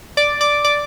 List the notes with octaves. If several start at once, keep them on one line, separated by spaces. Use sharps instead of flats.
D5 D6
D5 D6
D5 D6